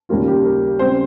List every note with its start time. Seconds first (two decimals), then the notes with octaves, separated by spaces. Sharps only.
0.09 D#2 C#3 G3 A#3 F4
0.28 G4
0.44 A#4
0.79 C#3 G3 C4 C5